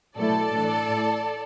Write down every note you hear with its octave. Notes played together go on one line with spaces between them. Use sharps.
B2 F#3 A3 E4 A4 D5
A2 E3 D4
A2 A3 E4